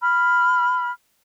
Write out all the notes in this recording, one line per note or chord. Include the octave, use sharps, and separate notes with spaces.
B5 F6